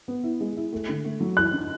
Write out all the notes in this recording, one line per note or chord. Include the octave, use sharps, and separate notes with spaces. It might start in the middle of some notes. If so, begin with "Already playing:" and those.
B3
E4
G#3
E4
A3
D3
A3
F#3
E3 F#6
D4